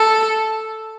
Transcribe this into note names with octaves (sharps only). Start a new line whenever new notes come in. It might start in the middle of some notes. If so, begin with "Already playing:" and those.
Already playing: A4